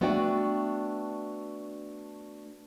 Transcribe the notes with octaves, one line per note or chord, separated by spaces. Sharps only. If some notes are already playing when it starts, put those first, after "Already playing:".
A3 B3 D4 F#4 D5 G5